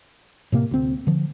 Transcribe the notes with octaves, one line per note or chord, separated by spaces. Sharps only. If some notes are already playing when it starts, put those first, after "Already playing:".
A2 C3 A#3
D2 C4
D3 F3